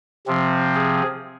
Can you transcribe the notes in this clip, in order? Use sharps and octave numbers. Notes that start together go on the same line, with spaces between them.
C3 F3 C4
G#4